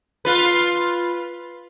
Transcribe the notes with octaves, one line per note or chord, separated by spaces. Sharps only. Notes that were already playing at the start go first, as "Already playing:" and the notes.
F4 B4